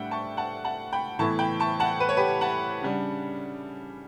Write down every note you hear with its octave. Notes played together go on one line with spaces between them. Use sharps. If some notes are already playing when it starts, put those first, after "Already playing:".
Already playing: A2 G3 D4 E5 F#5 G5
A5 C#6
F#5 A5
F#5 A5
G5 B5
A2 E3 B3 E4 A5 C#6
G5 B5
A5 C#6
F#5 A5
B4
C#5
G4 B4
F#5 A5
C#3 G3 D4